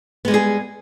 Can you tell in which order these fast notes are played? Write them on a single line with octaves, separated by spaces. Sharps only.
B3 G#3 G3 G#4